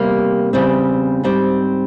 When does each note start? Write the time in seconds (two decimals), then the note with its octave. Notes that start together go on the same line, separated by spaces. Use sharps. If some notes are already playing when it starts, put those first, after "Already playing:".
Already playing: E2 C3 G3 A#3
0.53 E2 C#3 G3 C4
1.24 G#2 G3 C4